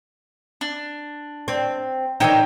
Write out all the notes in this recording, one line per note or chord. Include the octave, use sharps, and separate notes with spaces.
D4
C4
D#3 E3 D#4 C5 C#5 G5